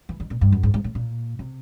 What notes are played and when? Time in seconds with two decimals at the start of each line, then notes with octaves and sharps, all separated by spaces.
0.09 E3
0.20 D#3
0.30 A#2
0.41 G2
0.52 F#2
0.63 G#2
0.74 G#2
0.84 A2
0.95 A#2
1.39 C3